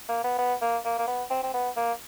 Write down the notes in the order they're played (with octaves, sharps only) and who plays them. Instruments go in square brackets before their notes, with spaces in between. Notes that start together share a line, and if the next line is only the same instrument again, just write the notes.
[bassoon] A#3
B3
B3
A#3
A#3
A#3
B3
C4
C4
B3
A#3